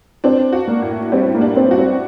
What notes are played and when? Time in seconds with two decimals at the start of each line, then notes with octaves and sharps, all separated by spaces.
0.24 C4 D4
0.53 F#4
0.68 A#3
0.82 A2
1.12 G3 C4
1.34 A#3
1.41 D4
1.56 C4
1.71 F#4
1.79 C4